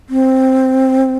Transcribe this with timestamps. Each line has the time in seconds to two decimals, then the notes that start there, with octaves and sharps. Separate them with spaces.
0.09 C4